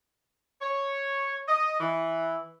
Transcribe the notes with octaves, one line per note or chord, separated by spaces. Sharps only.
C#5
D#5
E3